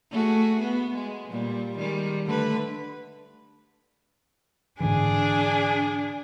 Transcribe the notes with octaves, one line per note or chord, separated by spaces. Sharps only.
A3 F#4 G#4
B3
G#3
A#2 G3
D#3 G3 G#3
D3 A3 B4
G#2 D3 E3 D4 G#4